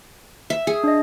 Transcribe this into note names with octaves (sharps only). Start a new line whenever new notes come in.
E5
G#4
D4 D#5